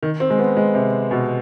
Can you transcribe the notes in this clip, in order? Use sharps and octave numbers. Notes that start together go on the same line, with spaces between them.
D#3
C4
G#3
B3
G#3
C3
B2